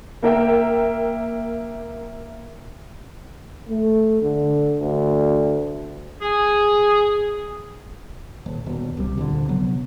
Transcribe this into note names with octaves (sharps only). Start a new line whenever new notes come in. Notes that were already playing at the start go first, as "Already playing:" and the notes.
A#3 A#4 E5 G5
A3
D3
D2
G#4
D#1
D#1 B2
C2 C3 D#3 G3
D2 A#2 D3
C3 F3 F#3 B3